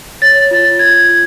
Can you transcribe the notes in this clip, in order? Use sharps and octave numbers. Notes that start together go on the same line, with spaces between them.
C#5 A6
F4
F4 G#6
F4